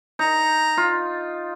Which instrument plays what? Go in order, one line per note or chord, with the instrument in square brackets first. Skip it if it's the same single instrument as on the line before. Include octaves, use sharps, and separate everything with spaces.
[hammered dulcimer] D#4 [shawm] A#5
[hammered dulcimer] F4